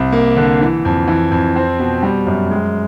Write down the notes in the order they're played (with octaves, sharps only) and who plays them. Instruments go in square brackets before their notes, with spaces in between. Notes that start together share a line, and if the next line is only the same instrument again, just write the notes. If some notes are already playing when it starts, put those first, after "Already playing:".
Already playing: [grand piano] C2
A#3
D3
E3
F2
E3
F2
C4
B2
G3
F#2
G#3